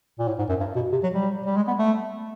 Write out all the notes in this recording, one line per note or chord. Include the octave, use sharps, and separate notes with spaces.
A#2
A2
G#2
F#2
G2
B2
C3
F#3
G3
G3
G#3
B3
A3